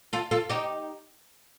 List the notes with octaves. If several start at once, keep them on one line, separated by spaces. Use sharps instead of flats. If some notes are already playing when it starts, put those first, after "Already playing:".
F4 A4
F4 A4
D#4 G4